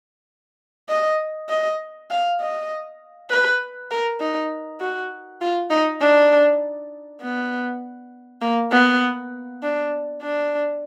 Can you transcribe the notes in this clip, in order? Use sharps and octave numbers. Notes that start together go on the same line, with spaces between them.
D#5
D#5
F5
D#5
B4
A#4
D#4
F#4
F4
D#4
D4
B3
A#3
B3
D4
D4